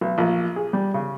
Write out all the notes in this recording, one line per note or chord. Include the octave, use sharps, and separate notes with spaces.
B1
A#1
G#4
G3
C#3